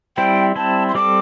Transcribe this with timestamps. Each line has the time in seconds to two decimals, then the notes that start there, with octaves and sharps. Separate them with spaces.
0.17 G3 C4 E4 C5 G5
0.56 G3 C4 E4 C5 A5
0.88 C6
0.95 G3 C4 A4 D6